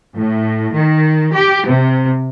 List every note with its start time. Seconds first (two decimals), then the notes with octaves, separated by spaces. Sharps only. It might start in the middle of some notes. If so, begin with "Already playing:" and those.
0.18 A2
0.76 D#3
1.36 G4
1.68 C3